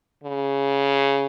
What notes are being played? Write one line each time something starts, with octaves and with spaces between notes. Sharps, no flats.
C#3